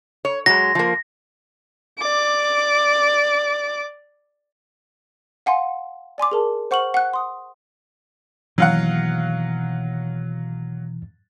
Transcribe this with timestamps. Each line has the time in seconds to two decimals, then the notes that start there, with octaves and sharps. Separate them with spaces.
0.25 C#5
0.46 F#3 G#3 A#6
0.75 F3 A#3
1.99 D5 D6
5.46 F5 F#5 G#5 C6
6.18 D5 G#5 C6 D6
6.32 G#4 A#4 A5
6.71 C5 F#5 C#6 F6 F#7
6.94 F#5 F#6
7.13 C6 D#6
8.58 B2 D#3 E3 F#3 A#3 F5 F#5